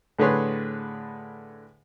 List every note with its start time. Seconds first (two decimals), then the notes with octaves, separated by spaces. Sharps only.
0.18 A2 D3 G#4 B4 C#5 C6